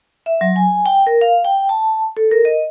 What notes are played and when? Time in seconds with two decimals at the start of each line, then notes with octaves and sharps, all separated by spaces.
0.26 E5
0.41 F#3
0.56 G#5
0.86 G5
1.07 A#4
1.21 F5
1.45 G5
1.69 A5
2.17 A4
2.32 A#4
2.45 D#5